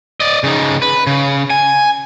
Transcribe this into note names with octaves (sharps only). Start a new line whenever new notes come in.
D5 D#5
C#3 D#4
B4
C#3
G#5